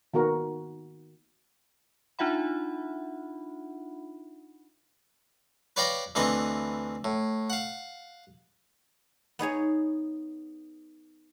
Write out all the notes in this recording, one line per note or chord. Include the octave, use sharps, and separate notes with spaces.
D#3 B3 F#4 A#4
D4 D#4 F4 E5 F#5 B5
B4 C#5 D5 F5 G5 A#5
D2 E3 C4 B4 D#5 C#6
A2
F5 F#5
B3 D#4 G#4 C#5